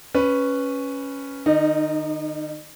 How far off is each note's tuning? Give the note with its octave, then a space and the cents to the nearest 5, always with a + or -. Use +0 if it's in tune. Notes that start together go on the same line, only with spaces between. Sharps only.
C#4 +0 B4 +0
D#3 -40 D#4 +0 D#5 -45